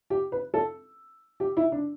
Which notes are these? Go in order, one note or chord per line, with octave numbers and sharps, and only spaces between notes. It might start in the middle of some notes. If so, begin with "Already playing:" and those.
G4
B4
A4
G4
E4
D4